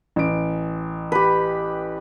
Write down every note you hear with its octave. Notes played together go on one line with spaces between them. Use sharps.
A1 D7
G4 B4